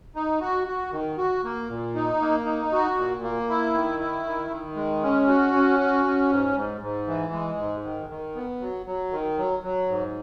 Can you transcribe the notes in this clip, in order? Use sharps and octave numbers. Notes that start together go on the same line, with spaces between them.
D#4
F#4
F#4
D#3
F#4
A#3
A#2
D#4
A#3
D#4
F#4
A#2
A#3
E4
D#3
E4
D#3
D#3
G#3
C#4
F#4
C#4
F#4
C#4
G#2
G#2
G#2
E3
G#3
G#2
D#3
D#3
B3
F#3
F#3
D#3
F#3
F#3
G#2